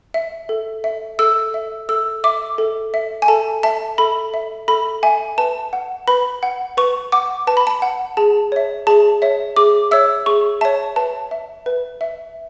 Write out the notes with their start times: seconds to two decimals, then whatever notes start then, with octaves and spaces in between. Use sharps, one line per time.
0.14 E5
0.49 A4
0.84 E5
1.19 A4 E6
1.54 E5
1.89 A4 E6
2.24 E5 D6
2.58 A4
2.94 E5
3.22 G#5
3.28 A4 A5
3.63 E5 A5
3.98 A4 B5
4.34 E5
4.68 A4 B5
5.03 E5 G#5
5.38 B4 A5
5.73 F#5
6.08 B4 B5
6.43 F#5
6.77 B4 C#6
7.12 F#5 D6
7.47 B4 A5
7.57 B5
7.67 A5
7.82 F#5
8.17 G#4 A5
8.52 C#5 E5
8.87 G#4 A5
9.22 C#5 E5
9.56 G#4 D6
9.91 C#5 E5 E6
10.26 G#4 C#6
10.61 C#5 E5 A5
10.96 B4 A5
11.31 E5
11.66 B4
12.01 E5